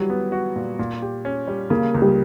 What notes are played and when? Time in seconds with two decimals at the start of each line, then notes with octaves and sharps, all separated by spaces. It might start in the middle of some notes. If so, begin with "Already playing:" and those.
Already playing: E3 F#3 G3
0.10 B3
0.32 F#4
0.56 A#2
0.79 A#2
1.02 G4
1.25 C#4
1.48 G3
1.70 C#3 A#3
1.95 C#2
2.02 G3